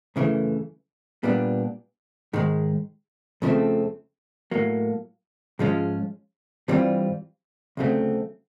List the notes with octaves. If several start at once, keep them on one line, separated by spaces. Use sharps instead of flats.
F#2 C#3 E3 A3
A#2 G3 B3 D4
G#2 D#3 G#3
F2 C#3 F3 A3 C4
A2 F#3 A#3
G#2 F3 G#3 C#4 F4
G2 E3 G3 C4 F4
D2 C#3 F#3 A3 C4